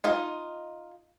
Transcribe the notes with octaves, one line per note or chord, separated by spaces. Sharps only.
D#4 F4 D#5